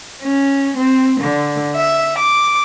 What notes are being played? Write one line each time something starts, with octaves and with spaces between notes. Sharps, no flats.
C#4
C4
D3
E5
D6